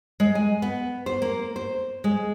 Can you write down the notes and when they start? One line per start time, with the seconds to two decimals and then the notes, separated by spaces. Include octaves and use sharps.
0.20 G#3
0.35 G#5
0.62 B3
1.06 C5
1.22 A#3
1.56 C5
2.04 G#3